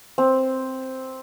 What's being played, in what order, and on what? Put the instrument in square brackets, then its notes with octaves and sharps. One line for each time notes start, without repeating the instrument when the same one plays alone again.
[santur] C4